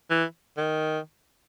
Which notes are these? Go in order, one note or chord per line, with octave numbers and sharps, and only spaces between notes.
E3
D#3